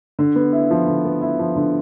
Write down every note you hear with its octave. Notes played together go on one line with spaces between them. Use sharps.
D3
B3
E4
F3
D3
B3
E4
F3
D3